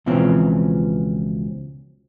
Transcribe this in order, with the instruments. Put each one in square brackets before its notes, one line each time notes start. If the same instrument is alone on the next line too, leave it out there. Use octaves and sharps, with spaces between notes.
[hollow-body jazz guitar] C#2 B2 E3 F3 C4 C#4